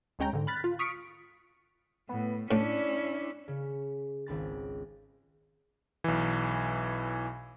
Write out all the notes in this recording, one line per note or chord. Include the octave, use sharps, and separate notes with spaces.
D2 G#3 C#4 G5 A#5
G#2 D3
B5 F6 F#6 A6 B6
F4
C#6 D#6 F6 B6 C#7 D7
A2 B3
A2 C#4 D4 E4
C#3
G#1 C#2 B5 A6
B1 E3